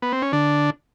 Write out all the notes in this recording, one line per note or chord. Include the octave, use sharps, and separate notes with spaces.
B3
C4
C#4
D3 D4